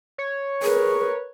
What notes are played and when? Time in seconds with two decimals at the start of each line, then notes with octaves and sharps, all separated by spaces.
0.18 C#5
0.63 G#4 A#4 B4